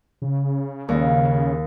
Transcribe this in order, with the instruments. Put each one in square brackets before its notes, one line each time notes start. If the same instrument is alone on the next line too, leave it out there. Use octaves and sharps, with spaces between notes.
[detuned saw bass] C#3
[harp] D#2